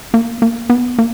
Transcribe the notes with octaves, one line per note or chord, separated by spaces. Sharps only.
A#3
A#3
B3
A#3